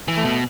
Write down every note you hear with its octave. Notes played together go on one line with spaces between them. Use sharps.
E3
A3
B2